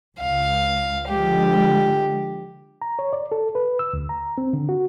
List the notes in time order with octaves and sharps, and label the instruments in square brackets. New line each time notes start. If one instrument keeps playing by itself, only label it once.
[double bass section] C#2 [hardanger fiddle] F5
[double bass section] D3 F3 G#3 [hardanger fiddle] G4
[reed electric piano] A#5
C#5
D5
A4
B4
E6
D2
A#5
C4
D3
F#4